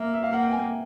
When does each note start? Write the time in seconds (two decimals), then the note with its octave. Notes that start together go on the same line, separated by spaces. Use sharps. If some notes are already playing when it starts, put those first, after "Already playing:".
Already playing: A#3 E5
0.13 E5
0.23 F5
0.29 A#3 F#5
0.43 G5
0.52 G#5